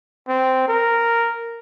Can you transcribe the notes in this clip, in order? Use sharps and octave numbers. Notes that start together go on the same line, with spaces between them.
C4
A#4